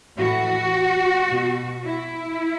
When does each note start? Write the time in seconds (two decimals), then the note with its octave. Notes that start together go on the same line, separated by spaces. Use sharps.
0.18 A2 E3 F#4
1.29 B2
1.85 E4